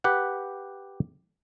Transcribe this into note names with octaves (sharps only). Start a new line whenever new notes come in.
G4 B4 F#5